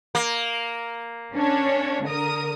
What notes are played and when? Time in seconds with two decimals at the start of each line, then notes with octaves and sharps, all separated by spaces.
0.15 A#3
1.34 C#4 D4 C#5
2.04 D3 A#4 D#6